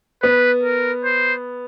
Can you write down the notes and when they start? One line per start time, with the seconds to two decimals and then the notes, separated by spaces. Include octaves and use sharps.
0.23 B3 B4
0.63 A#4
1.05 C5